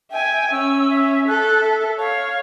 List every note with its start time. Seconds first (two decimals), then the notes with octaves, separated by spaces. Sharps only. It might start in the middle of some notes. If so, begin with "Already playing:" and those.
0.11 E5 G5 G#5
0.52 C#4 E6
0.90 E5
1.28 A4 F#6
1.61 E5
1.99 C#5 F5